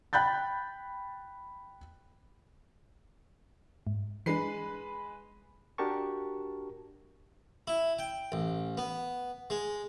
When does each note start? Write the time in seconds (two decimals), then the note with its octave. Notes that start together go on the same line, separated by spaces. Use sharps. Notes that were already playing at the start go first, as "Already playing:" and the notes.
0.13 G5 B5 F#6 G6 A6
3.87 G#2
4.26 E3 G#3 D4 B4 C7
5.78 D4 F#4 G4 A#4 A5 C#6
7.67 E4
7.99 G5
8.32 A1
8.78 B3
9.50 G#3